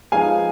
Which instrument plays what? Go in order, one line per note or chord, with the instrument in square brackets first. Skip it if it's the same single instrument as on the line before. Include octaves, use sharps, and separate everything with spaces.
[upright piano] F3 G#3 B3 D#4 F5 G#5